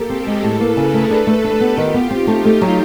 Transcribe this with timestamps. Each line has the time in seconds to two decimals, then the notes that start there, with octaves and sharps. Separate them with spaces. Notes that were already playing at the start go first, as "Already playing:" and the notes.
Already playing: A#3 G4 A4
0.09 C4 G#4 A#4
0.27 G#3
0.43 A2 A4 B4
0.61 A#3
0.77 C#3 G#4 A#4
0.94 A3
1.10 D4 A4 B4
1.27 A3
1.44 D4 G4 A4
1.61 B3
1.77 D#3 F4 G4
1.94 B3
2.11 C4 D#4 F4
2.27 A3
2.45 A3
2.61 F#3